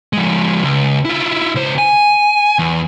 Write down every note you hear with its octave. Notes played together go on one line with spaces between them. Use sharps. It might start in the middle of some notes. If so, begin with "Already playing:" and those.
F3 G#3
C#2
E4 F4
C#2 C5
G#5
E2